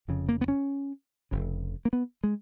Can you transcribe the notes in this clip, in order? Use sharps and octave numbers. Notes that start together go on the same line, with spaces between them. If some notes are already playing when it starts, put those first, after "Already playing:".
F1 F2 C#3
A#3
B3
C#4
F1 F2 C#3
A#3
B3
G#3